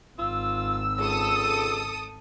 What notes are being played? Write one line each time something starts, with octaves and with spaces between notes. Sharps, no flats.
G#1 F4 E6
C#2 A4 D#6